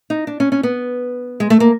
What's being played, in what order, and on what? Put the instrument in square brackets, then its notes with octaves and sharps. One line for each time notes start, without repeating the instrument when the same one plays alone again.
[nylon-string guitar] D#4
D4
C#4
C#4
B3
G#3
A3
A#3